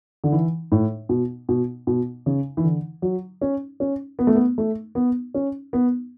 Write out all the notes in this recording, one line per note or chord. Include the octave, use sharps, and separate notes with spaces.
D3
E3
A2
B2
B2
B2
C#3
E3
D3
F#3
C#4
C#4
B3
A3
B3
A3
B3
C#4
B3